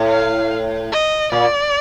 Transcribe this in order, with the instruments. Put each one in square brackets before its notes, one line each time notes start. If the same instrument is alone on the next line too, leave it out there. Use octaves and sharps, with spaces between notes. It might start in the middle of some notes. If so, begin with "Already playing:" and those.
Already playing: [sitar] A2
[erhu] F5
D#5
[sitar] A#2 [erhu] D5